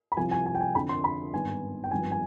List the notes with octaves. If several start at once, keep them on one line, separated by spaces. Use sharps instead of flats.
B5
C2 C3 F3 G#5
G#5
G#5
G5
G#5
F2 D3 F3 B5
C6
B5
G#1 G2 D#3 B3 G#5
G5
G#1 G2 F3 B3 G#5
G#5